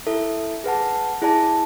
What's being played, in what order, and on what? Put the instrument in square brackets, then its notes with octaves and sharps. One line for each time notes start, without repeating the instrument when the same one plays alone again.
[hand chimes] E4 A4 E5
G#4 B4 F#5 A5
E4 G#4 D5 A5